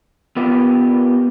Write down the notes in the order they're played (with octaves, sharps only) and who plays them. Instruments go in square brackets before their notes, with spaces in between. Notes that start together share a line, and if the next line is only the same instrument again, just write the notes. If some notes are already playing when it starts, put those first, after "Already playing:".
[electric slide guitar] B3 F4 G4 A#4 B4